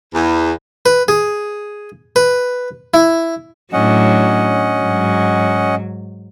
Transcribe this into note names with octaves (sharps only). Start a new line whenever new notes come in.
E2
B4
G#4
B4
E4
A2 F#3 C#4 D4 D#5 F#5
G#2 F#3